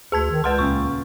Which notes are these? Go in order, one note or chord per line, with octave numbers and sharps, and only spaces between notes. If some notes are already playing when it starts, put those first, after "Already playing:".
D2 G#4 A5 G#6
D#3
C#2 B4 F#5 C6 F6 G6 A6
D#1 C#3 G5 C#6